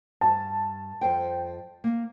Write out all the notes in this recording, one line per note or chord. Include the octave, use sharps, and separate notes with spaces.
G2 A5
F2 C5 G5
A#3